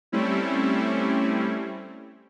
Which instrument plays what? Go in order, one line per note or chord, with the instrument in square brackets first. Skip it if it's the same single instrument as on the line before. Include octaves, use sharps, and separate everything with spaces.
[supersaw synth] G3 A3 C4 C#4 E4